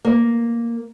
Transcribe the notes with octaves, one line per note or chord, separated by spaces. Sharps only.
A#3